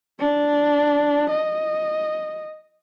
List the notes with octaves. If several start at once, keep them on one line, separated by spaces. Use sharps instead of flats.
D4
D#5